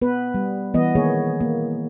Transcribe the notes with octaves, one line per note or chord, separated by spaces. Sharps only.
B3 B4
G3
E3 B3 D#5
D#3 A#3 G#4 C#5
A#3